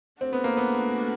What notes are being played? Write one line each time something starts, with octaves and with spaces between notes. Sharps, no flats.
A3 C4 D4 F#4 A4
B3
A#3
B3